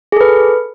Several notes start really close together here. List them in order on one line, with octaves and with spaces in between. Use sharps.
G#4 A4 B4